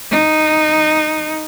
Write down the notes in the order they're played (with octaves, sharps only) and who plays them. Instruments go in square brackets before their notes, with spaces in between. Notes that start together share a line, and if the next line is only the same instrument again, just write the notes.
[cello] D#4